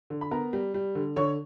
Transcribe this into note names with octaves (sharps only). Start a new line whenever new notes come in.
D3
B5
B3 A#4 A#5
G3
G3
D3
D3 C#5 C#6